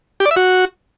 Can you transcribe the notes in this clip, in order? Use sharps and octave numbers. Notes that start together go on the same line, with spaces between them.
G4
D5
E5
F#4